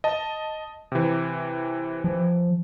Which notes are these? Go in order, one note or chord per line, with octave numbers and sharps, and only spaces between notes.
D#5 A5
C3 E3
F3